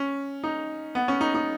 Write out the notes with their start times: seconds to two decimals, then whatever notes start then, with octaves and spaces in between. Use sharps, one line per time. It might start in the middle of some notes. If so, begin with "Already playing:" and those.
Already playing: C#4
0.44 D#4
0.95 B3
1.08 C#4
1.21 D#4
1.34 D#4